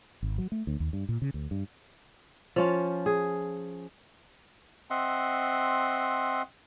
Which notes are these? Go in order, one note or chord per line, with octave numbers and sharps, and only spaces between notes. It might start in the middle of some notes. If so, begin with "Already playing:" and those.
G#1
F#3
A3
D2
D#2
G2
A#2
C#3
D2
G2
F3 C#4 F4
G#4
C4 D#5 E5 F#5 C6